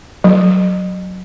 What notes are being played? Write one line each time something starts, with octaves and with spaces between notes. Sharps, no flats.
F#3